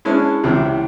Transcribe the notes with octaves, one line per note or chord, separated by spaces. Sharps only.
G#3 C#4 D4 E4
C#2 C3 E3